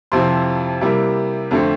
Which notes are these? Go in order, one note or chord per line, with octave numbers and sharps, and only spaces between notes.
F2 C3 F3 C4 E4 C6
C3 G3 A#3 E4
F2 D3 A3 C4